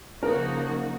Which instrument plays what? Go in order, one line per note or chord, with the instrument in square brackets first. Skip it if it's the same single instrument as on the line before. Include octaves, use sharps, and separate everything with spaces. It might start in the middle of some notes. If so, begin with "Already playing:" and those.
[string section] C#3 F3 A#3 D#4 F#4 [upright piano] A#4